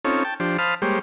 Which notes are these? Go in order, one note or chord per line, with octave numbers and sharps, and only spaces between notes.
C4 C#4 D#4 F4 A4 C#5
G5 A5
F3 D4 G4 C5
C5 F5 A5 B5 D#6 F6
G3 G#3 A#3 G4 C5 C#5